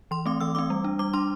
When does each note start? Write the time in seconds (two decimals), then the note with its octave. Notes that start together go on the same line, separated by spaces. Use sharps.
0.11 E3 C6
0.26 A3 C4 D6
0.41 E3 E6
0.55 A3 C4 D6
0.70 G3
0.84 D4
0.99 G3 D6
1.13 D4 C6